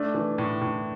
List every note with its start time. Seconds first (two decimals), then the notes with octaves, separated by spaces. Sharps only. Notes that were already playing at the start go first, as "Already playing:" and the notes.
Already playing: A3 D4
0.14 E3
0.38 A2
0.62 A2